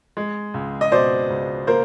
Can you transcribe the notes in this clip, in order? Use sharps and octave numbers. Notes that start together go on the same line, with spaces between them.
G#3
C#2
D#5
B2 C5 D5
C#2
A#3 A#4 C5